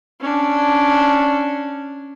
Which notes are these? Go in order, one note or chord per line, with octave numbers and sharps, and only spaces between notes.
C#4 D4